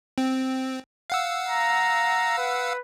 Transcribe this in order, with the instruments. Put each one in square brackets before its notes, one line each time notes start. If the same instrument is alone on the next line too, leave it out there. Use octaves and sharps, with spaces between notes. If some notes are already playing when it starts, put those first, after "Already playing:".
[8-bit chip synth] C4
F5 F#5 E6
[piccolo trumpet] A#5
B4